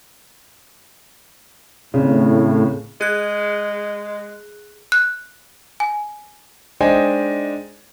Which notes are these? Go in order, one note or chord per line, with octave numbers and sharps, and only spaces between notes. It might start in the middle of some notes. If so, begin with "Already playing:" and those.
G#1 A2 C#3
G#3 G#4 F#6
F#6
G#5
G#3 D4 D#4 C5 G5 G#5